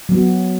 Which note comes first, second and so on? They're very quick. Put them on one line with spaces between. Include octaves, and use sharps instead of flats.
F#3 B3 F#4